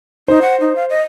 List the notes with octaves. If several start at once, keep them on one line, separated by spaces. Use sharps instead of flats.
D#4 C5
F#5
D#4
F5
D#5